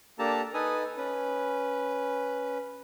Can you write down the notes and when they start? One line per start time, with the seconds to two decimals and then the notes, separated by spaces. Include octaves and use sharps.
0.19 A#3 D4 G4 A4 A5 A#5
0.54 D#4 A4 B4 G#5 D#6
0.97 C#4 B4